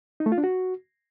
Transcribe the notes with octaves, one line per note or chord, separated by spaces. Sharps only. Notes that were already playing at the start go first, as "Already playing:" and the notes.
D#4
A3
F4
D4
F#4